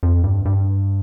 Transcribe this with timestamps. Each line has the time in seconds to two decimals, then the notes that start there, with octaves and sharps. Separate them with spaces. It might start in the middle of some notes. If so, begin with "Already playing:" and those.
0.03 F2
0.24 G2
0.45 G2